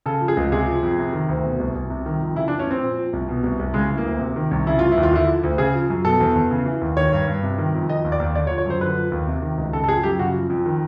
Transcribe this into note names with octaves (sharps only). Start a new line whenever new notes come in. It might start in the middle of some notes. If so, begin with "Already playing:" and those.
C#3 A4
F3
G#4
C#2
C3 G#4
F3
F2
C3
D#3
D2
B2
C2
C2
C3
D#3
F2
C#3 E4
D4
E3
C#4
F2 C4
A#2
F3
C2
B2
C2
C2
C#3 G#3
E3
A#3
D2
C3
D#3
C2
C#3 E4
E3 F4
E4
D#2
F4
D3 E4
F3
D2
C#3 G#4
F3
F#2
B2 A4
E2
E2
C#3
E3
D#2
D#3 C#5
G2
G2
C3
D#3
F2
D#3 D#5
D#2
D5
D#2
D3 D5
C#5
F3
C#5
F#2 C5
D3 B4
F3
D#2
C3
D#3
C#2
C#3 A4
A4
F3 G#4
F#2 G4
C#3 F#4
F3
F2
D#3